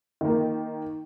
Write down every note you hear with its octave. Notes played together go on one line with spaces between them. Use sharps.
D#3 A#3